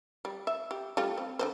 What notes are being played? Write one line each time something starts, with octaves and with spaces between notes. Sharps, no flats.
G3
E5
G4
G3 A3 F4
C4
D3 B3 C5